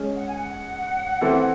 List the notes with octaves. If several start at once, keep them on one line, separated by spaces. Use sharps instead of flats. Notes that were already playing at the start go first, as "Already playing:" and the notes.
Already playing: G#3 C#4 G#4
F#5
G#5
F#5
E3 C4 E4 A4